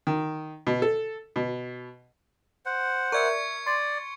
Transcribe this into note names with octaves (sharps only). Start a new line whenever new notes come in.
D#3
B2
A4
B2
C5 F#5
A#4 D5 E5 C#6 G#6 C#7
D5 C6